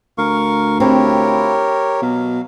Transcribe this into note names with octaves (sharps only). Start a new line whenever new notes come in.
D2 A#4 F5 C#6
C4 E4 F4 G4 A#4 C#5
B2 F#3 F5